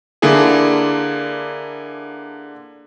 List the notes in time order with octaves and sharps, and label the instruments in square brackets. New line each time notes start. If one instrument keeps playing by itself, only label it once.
[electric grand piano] D3 A#3 D4 E4 G#4